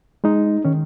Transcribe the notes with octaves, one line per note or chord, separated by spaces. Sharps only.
G#3 D#4
D#3 C#4